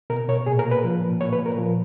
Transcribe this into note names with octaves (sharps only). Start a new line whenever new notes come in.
B2 A#4
B2 C#5
A#2 G#4
A#4
A#2
B4
F3
A#2
A#2 C#5
B4
A#2
A#4
F3